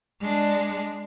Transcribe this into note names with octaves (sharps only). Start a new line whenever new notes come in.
G#3 D4